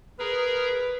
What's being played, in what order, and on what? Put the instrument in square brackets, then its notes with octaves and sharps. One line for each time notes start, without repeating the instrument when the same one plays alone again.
[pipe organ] G#4 A#4 A#5 [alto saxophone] B4